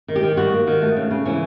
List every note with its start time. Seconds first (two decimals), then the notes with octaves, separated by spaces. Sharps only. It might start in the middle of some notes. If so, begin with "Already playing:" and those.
0.08 D#3
0.16 G4
0.23 D#3
0.37 G3 F#4
0.53 A#3
0.67 D#3
0.82 A3
0.97 C#3
1.11 C#3
1.25 E3 C#4